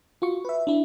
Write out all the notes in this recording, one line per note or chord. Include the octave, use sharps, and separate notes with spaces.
F4 F#4 C#6
B4 E5
D4 E4